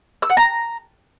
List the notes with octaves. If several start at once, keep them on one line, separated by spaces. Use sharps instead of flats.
E6
F#5
A#5